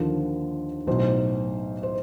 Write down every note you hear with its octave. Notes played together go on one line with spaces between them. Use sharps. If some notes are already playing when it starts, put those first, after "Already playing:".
Already playing: D#2 D3 F3 A#4
B1 A2 F#3 C5
C5